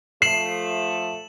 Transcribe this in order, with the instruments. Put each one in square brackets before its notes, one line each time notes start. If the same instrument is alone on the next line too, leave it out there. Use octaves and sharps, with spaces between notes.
[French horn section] F3 A3 [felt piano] C7 [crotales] E7 F#7